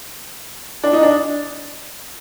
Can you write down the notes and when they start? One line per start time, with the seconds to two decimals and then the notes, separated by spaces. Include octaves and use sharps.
0.84 D4
0.93 D#4
1.03 D4